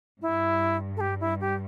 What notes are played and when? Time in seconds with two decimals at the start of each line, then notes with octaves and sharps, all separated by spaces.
0.22 G2 E4
0.97 A4
1.01 G4
1.21 E4
1.41 G4